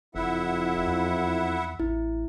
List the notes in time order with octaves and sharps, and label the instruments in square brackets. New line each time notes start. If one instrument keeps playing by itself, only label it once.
[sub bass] F#1 [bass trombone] F2 [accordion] E4 E5 F#5
[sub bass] E2
[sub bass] A1 [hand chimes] E4